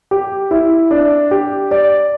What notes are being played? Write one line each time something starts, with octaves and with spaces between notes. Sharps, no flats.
G4
E4
D4
G4
D5